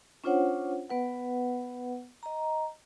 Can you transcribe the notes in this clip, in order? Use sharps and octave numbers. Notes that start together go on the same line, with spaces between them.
C#4 D4 F4 C5 C#5 F#5
B3 B4 F#5
D#5 A#5